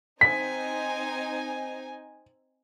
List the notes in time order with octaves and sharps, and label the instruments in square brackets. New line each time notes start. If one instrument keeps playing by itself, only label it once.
[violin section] C4 D#4 G#5 [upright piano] B6